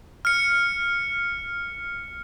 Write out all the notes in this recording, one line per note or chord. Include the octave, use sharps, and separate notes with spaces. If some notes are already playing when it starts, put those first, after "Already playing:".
F6 C#7